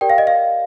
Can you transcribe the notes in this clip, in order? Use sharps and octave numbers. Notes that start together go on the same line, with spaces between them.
G4 A#4 D5 G5
F5
D#5
F5